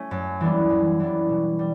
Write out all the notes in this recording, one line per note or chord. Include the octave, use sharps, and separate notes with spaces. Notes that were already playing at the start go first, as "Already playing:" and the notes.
Already playing: A3 C#4
F#2
E3 G3 B3 D4
F#2
E3 G3 B3 D4
B2
G3